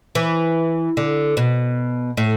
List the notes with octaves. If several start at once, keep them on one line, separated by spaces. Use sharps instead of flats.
E3
D3
B2
A2